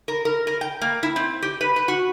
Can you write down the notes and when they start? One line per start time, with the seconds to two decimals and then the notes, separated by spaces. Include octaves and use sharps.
0.08 A#4
0.25 A#4
0.47 A#4
0.61 G5
0.81 A#3
1.03 E4
1.16 C4
1.42 G4
1.61 B4
1.76 B4
1.88 F#4